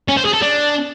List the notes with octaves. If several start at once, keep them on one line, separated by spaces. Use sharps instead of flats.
C#4
C5
G#4
A4
D4